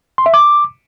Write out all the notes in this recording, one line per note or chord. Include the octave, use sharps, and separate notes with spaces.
C6
E5
D6